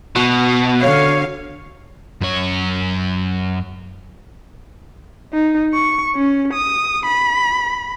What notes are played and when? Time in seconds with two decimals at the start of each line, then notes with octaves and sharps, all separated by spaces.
0.16 B2 F#4 C#6
0.82 D3 C#5 F5
2.21 F#2 C#5
5.33 D#4
5.73 C#6
6.16 C#4
6.53 D#6
7.06 B5